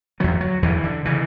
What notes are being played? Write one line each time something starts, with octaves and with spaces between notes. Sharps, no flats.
E2 D3 F#3
F#3
E2 D3 E3
D3
C#3 E3